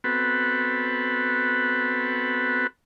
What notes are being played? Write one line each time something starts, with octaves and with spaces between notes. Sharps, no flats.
B3 C4 F#4 A4 B4